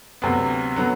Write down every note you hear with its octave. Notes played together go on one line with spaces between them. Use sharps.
D2 C3 F#3 B3
D3 F#3 B3